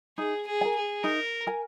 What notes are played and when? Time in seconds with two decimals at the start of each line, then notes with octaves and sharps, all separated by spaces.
0.18 D#4 G#4
0.47 G#4
0.61 A#4 G#5
0.76 G#4
1.03 D#4 A#4
1.47 A#4 G#5